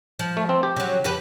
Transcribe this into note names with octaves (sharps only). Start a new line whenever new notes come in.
F3
A3
C4
G4
C#3 F#3
F2 G4 B4